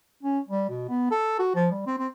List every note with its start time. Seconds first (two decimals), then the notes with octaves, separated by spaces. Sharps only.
0.23 C#4
0.48 G3
0.70 B2
0.89 B3
1.11 A4
1.39 F#4
1.55 F3
1.71 G3
1.86 C4
1.98 C4